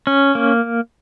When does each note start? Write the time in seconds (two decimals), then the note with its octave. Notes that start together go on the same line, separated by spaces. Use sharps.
0.07 C#4
0.35 A#3